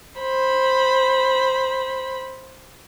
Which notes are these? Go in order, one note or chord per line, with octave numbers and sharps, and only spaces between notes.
C5 B5